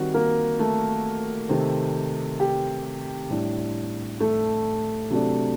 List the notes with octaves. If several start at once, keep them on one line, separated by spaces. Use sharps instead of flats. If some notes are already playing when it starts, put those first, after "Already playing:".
Already playing: D#3 G3 C4 F#4
A#3 A#4
A3 A4
C3 D#3 A3 C4
G4
A2 G3 D4
A3 A4
C3 F#3 A3 D4